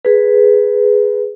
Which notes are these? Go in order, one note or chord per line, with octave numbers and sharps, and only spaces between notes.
G#4 B4